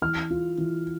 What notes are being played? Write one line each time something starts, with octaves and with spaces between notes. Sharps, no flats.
E3 F6
F4
E3